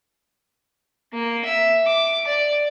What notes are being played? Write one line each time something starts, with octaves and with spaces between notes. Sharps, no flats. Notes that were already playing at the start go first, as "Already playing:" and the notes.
A#3
E5
D6
D5